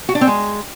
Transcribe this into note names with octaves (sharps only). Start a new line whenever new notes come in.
F#4
D4
C4
G#3